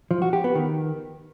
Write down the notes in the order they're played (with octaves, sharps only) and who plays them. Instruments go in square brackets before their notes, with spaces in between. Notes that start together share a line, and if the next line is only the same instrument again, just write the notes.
[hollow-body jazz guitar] F3
F#4
G4
B3
D#3